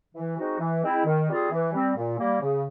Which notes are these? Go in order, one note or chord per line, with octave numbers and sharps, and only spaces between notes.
E3
G#3 C4 D#4 F#4
E3
G#3 C4 E4
D#3
G3 C4 F4 G#4
E3
G3 C4
A#2
G3 A#3
C#3